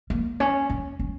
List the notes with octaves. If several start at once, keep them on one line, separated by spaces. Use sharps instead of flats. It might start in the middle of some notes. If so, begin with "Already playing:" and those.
A#3
C#4
C#4
C#4